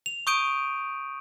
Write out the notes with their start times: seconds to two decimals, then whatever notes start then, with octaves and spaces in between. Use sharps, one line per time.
0.06 F7
0.27 C#6 D#6 G6 D7 D#7